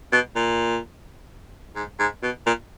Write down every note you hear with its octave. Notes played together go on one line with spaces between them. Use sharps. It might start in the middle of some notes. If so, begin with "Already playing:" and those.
B2
A#2
G#2
G#2
B2
A#2